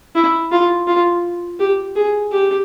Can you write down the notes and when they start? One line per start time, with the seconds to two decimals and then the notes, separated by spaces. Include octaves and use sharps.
0.15 E4
0.52 F4
0.87 F4
1.60 G4
1.96 G#4
2.32 G4